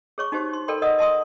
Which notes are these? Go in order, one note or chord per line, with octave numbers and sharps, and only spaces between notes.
G#4 C#5 C#6
D#4 F#4 G4 C5
C6
A4 A#4 D5 G5 B5 C6
A#4 D5 D#5 F#5 D#6
D#5 A5 C6 D#6